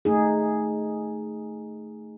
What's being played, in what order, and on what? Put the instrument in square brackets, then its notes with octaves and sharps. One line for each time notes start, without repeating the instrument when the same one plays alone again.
[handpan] A3 D#4 G#4